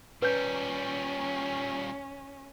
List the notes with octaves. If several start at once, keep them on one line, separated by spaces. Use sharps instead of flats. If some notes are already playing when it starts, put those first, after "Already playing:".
A#2 G3 C#4 B4 G6